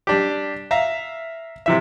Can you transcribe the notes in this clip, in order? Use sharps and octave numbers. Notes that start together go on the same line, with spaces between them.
G3 D4 G4
E5 F5 A#5
C3 E3 E5